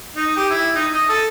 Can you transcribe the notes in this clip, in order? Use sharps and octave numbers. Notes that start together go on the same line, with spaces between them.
D#4
G4
E4
D#4
D#5
A4